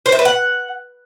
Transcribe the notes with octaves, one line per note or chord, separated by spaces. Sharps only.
C5
E5
B4
F#5